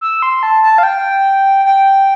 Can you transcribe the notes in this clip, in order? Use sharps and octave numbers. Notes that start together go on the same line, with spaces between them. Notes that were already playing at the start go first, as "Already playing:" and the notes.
E6
C6
A5
A5
F5
G5
G5